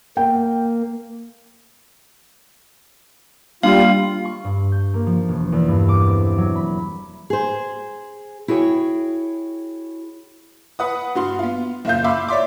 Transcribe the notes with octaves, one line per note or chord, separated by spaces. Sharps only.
A#3 G5
G3 A#3 D4 F4 F5
C#6
G2
G6
A#3
F3
E1
E2
G2
D6
C4
F#3
B5
G#4 C5
E4 F#4 G#4 C#5 G5
B4 F#5 D#6
G2 F#4 C6
B3 F4
F#1 A#2 F4 F5 G6
E5 F5 B5 C6 D6 E6
C#5 D5 E5 C6 D6